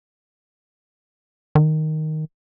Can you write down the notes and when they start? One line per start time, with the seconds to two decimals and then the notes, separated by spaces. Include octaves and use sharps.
1.55 D#3